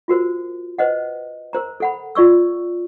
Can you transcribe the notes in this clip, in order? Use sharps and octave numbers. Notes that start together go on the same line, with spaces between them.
F4 F#4 A#4 C5
B4 C5 D#5 F#5
A#4 C5 A#5
A4 F#5 B5
F4 D5 C#6 E6